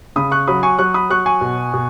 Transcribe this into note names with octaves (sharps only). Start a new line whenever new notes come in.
C#3 B5 D#6
C#6 F#6
F#3 B5 D#6
G#5 C#6
F#3 C#6 F#6
B5 D#6
F#3 C#6 F#6
G#5 C#6
B2
B2